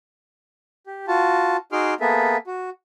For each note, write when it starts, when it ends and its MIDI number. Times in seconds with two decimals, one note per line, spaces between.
0.87 1.06 67
1.08 1.57 65
1.08 1.57 66
1.08 1.57 81
1.72 1.94 63
1.72 1.94 66
1.72 1.94 68
1.72 1.94 84
1.72 1.94 86
1.72 1.94 89
2.00 2.37 58
2.00 2.37 59
2.00 2.37 68
2.00 2.37 69
2.00 2.37 76
2.47 2.70 66